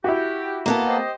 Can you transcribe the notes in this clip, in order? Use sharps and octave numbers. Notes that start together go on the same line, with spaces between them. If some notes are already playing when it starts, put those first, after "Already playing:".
E4 F#4 G4
A#3 B3 A4
G4 C5 D#5